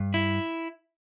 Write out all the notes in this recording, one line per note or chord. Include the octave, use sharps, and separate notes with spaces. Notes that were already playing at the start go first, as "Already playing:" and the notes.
Already playing: G2
E4